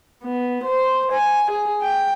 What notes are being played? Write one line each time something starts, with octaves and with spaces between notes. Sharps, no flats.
B3
C5
G#5
G#4
G5